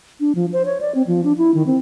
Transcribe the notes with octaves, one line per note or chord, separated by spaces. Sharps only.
D4
F3
C5
C#5
D5
C4
F3
D4
E4
D#3
C4